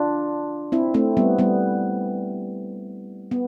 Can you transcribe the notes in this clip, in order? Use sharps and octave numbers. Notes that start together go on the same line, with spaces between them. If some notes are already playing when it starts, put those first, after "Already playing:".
Already playing: D4 F4
C4 E4
A3 C4
G3 B3
G3 B3
B3